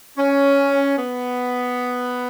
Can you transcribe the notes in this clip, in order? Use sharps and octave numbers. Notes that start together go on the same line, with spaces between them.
C#4
B3